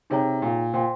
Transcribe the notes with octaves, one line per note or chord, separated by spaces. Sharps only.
C3 D#4 G#4 C#5 G5 A#5
A#2
A#2 C5 G5 C6